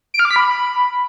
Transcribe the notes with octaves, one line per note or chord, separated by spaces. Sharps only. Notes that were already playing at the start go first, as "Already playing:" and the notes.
D7
F6
D6
B6
B5